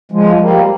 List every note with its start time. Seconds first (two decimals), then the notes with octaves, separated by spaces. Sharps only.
0.12 F3 G#3
0.40 G3 A#3